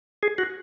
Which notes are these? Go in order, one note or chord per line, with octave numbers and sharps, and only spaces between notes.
G#4
F#4